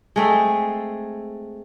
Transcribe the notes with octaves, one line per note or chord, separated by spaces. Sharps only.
G#3 A3 C4 A4